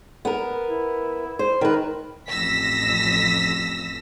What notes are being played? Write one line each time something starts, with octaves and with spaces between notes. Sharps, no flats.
B3 A#4
E4
C5
D#3 A#4 B4
A1 F2 E6 A#6 B6